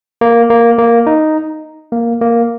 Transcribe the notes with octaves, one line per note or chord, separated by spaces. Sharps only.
A#3
A#3
A#3
D#4
A#3
A#3